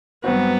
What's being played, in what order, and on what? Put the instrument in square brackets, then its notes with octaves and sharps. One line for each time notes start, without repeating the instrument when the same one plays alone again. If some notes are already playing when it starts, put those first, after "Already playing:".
[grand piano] G2 F#3 C4 F#4 [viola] B3